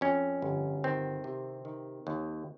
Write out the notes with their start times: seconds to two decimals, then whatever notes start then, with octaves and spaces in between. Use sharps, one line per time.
0.01 F2 C#4
0.42 G1
0.84 D#3 C4
1.24 C3
1.65 D#3
2.07 D#2